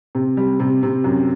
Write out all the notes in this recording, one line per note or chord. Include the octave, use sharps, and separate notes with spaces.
C3
G3
C3
C3
F#2